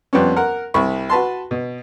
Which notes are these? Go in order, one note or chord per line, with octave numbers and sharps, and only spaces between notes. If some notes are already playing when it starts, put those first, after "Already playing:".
F2 G3 B3 C#4
A#4 F#5
C2 B5 C#6
F#4 B4 A5 C6
B2